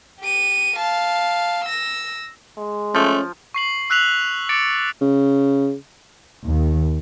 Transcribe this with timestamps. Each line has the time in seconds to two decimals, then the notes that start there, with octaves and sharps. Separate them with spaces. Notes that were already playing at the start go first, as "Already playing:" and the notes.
0.20 G4 D#7
0.76 F5 A5
1.64 E6 A#6
2.57 G#3
2.95 F3 A3 C#4
3.54 C#6 C7 F#7
3.90 E6 F#6 B6 F7 F#7
4.49 D6 A6 C#7 D7
5.01 C#3
6.44 D#2